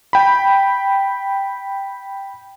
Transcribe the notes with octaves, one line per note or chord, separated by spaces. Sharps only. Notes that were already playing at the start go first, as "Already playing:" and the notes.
G5 B5